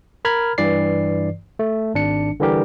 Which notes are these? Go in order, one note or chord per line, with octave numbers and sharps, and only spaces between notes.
A#4 A#5 B5 F6 G#6
G2 E3 D5 C7
A3
G#1 D4 C#7
D3 E3 G3 G4 A#4